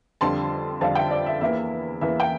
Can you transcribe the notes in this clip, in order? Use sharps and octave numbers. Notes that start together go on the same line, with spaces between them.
F2 D3 G3 D4 F4 A5 C6
F2 D3 G3 D4 F4 F5 A5
E5 G5
D5
E5
E2 E3 A#3 E4 E5
E2 E3 A#3 E4 E5
G5